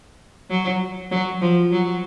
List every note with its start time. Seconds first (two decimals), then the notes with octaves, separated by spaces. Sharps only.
0.50 F#3
1.11 F#3
1.42 F3
1.72 F#3